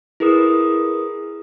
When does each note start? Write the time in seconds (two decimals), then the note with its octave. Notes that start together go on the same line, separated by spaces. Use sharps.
0.20 E4 G#4 A#4 B4 D#6